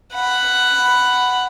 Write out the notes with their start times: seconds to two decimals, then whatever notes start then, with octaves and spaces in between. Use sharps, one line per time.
0.14 F#5 B5